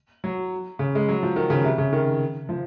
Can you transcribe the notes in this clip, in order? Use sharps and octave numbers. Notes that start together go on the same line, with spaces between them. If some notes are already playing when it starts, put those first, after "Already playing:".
F#3
C#3
G#3
F#3
F3
D#3
C#3
C3
C#3
D#3
F3